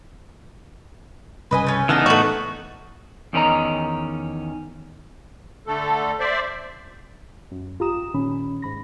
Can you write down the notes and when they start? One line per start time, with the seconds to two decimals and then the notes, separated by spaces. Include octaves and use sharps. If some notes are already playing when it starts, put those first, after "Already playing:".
1.51 C2 G2 C#3 B4 D#5 G#5
1.67 A3 C#4
1.89 C#3 E3 B3 D4 D#4 A4 F6
2.06 A2 A3 F#4
3.33 E2 D#3 C#4 D#5 A#5
5.67 D3 A3 A4
6.20 C5 D5 E5
7.51 F#2
7.79 G#1 F4 G4 A#5 D#6 E7
8.14 A#2 D#3 C#4 B5
8.62 G#2 B5 A#6